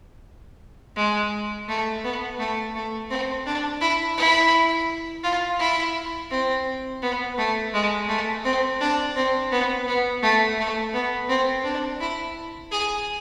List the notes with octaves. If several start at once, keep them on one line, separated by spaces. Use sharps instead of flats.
G#3
A3
B3
A3
A3
C4
D4
E4
E4
F4
E4
C4
B3
A3
G#3
A3
C4
D4
C4
B3
B3
A3
A3
B3
C4
D4
E4
G#4